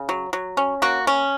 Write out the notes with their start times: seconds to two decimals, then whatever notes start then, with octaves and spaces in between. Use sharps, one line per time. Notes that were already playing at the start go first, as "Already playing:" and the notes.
Already playing: C#3
0.09 F#3
0.33 F#3
0.57 C#4
0.82 A#3 F#4
1.07 C#4